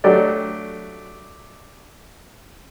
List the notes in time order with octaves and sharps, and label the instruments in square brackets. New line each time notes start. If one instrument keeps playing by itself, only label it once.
[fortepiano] F#3 A3 D4 G4 D5 D#5